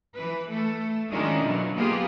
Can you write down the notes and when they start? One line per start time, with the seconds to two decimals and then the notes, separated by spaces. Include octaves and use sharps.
0.15 E3 B4
0.49 A3 A4
1.12 D#3 G#3 C#4 D4 E4 F4
1.43 B2 D3 F#3
1.76 A#3 B3 F4 G4 G#4